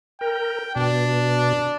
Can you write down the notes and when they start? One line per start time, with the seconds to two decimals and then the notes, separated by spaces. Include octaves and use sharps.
0.21 A#4 G5
0.76 B2 D4